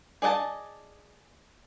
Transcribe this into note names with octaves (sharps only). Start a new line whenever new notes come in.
G#4 D5 D#5 F#5 A5